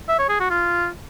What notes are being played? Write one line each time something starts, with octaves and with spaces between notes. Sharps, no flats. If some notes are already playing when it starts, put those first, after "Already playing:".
E5
C#5
G#4
F#4
F4